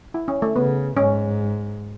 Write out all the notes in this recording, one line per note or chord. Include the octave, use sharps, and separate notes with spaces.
E4
C#4
A3
C#3 B3
G#2 C#4